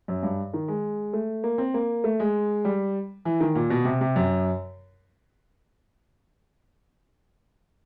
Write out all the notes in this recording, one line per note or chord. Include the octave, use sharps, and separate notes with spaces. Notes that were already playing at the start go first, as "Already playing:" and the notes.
F#2
G2
D#3
G#3
A3
A#3
C4
A#3
A3
G#3
G3
E3
D#3
A#2
B2
C3
C3
F#2